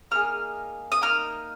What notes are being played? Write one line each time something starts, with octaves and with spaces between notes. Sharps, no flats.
A#3 D#4 G#4 F6
D#6
A#3 D#4 F6